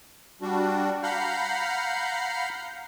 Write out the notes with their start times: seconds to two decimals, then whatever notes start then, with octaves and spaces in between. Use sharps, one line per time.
0.42 G3 D4 F#4
1.03 F5 F#5 A#5 B5 F6 G6